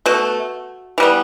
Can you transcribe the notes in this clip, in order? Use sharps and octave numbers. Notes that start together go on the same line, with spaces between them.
B2 A3 F#4
E3 G3 B3